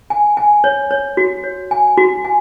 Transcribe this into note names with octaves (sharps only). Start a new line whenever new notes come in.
G#5
G#5
C#5
C#5
F#4
C#5
G#5
F#4
G#5